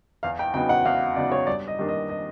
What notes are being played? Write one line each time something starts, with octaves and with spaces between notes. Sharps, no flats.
E2 F5
G5
C#3 F#3 B3 D#4 G5
F#5
E2 F5
C#3 F#3 B3 D#4 D5
C#5
G2 D5
D#5
D#3 G3 A#3 D4
D#5
D#5